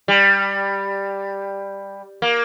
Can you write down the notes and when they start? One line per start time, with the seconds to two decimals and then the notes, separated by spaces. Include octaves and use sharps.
0.08 G3
2.22 A#3